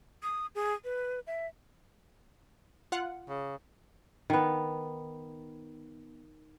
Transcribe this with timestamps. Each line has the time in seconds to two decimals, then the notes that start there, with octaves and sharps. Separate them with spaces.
0.23 D#6
0.55 G#4
0.84 B4
1.27 E5
2.92 F4 F#5
3.29 C#3
4.30 D#3 B3